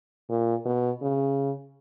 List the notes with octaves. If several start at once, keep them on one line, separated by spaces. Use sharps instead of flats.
A#2
B2
C#3